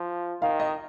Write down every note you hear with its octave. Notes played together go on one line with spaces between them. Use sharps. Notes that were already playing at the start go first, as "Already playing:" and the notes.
Already playing: F3
D#3 F5
D#5